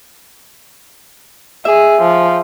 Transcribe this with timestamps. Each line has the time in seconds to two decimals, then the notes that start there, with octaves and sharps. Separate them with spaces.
1.65 G#4 E5
2.01 F3